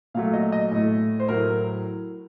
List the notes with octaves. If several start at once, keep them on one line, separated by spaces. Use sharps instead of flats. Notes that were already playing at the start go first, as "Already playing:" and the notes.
A#2 F#3 A3 F5
D#5
D#5
A2 A3
C5
A2 F#3 A3 A#4